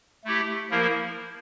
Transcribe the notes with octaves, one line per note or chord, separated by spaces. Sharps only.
A3 E4 G4
F3 A#3 E4 A#4